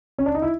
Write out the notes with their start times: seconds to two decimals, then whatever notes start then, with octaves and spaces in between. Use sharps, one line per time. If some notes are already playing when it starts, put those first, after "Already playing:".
0.18 C#4
0.26 D4
0.35 D#4
0.42 E4